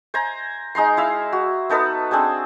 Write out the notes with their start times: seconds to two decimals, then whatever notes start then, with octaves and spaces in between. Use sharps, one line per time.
0.14 C5 G#5 A#5
0.75 G#3 D#4 A#5 C6
0.97 E4 F5 E6
1.33 F#4
1.69 B3 D#4 A4 B4
2.11 C4 D4 G#4 C5